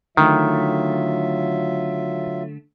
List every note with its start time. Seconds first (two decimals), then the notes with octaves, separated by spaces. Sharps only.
0.17 D3 D#3 F#3 A3 F4 E5